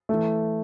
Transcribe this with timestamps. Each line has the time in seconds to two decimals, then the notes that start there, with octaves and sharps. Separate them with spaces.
0.09 E3 A3